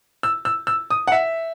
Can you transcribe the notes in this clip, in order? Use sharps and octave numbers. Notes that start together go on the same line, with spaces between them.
E6
E6
E6
D#6
F#5
E5